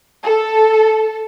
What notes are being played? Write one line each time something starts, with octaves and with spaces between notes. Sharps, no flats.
A4